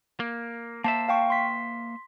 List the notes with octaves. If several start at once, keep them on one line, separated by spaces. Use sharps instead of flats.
A#3
A#3 C5 E5 A5
F5 G5 C#6
C6 B6